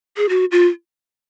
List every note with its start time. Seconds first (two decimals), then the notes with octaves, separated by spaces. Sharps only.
0.17 G#4
0.29 F#4
0.52 F4